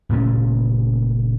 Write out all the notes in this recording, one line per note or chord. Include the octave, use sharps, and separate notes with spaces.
F#1 A#2 A3 C#4